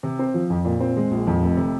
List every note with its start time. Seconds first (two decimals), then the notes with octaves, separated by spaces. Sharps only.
0.03 C3
0.19 C4
0.34 F3
0.50 F2
0.65 A#2
0.80 C4
0.97 G#3
1.11 A#1
1.27 F2
1.42 F1
1.57 C3